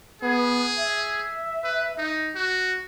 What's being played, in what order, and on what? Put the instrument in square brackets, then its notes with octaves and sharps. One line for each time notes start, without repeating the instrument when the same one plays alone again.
[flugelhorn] B3 [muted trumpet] G#4
[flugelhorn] E5
[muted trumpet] B4
D#4
F#4